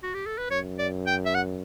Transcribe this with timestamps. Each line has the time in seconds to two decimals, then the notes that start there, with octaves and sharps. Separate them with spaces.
0.03 F#4
0.14 G4
0.26 A4
0.38 B4
0.50 F#2 C#5
0.79 D5
1.07 G5
1.26 E5
1.35 F#5